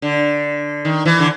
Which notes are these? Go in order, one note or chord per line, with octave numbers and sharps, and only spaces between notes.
D3
D#3
E3
D3